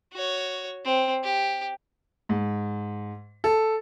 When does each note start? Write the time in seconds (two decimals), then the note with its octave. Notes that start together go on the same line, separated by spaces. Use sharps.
0.13 F#4 C#5
0.85 C4
1.23 G4
2.29 G#2
3.44 A4